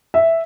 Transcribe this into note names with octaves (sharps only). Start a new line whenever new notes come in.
E5